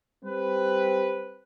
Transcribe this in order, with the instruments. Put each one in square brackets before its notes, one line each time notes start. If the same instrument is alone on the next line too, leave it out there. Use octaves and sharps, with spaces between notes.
[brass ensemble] G3 C4 B4